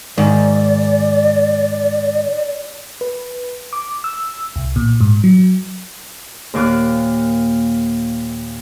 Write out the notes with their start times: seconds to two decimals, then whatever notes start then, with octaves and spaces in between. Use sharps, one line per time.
0.18 G#2 D#3 D5
3.01 B4
3.73 D6
4.04 E6
4.56 C2
4.76 A#2
5.01 G#2
5.24 F#3
6.54 D#2 A#2 A#3 D6 F#6